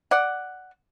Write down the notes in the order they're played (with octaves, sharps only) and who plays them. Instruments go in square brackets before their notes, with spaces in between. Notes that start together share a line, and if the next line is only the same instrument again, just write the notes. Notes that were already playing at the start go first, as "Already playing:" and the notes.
[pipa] D5 F#5